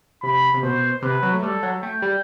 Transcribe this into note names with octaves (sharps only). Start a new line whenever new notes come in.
C3 B5
C3
B2 C5
C3 B4
F#3
A3
G3 A4
F#3
A3 G5
G3